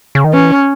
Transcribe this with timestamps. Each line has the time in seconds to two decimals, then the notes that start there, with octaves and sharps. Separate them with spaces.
0.15 C#3
0.24 D#3
0.33 E3 C#4